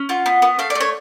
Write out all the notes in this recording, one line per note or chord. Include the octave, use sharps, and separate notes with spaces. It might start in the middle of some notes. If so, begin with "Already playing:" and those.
Already playing: C#4
F4 F#5
B3
B3
A3 F5
D5
A3
C#5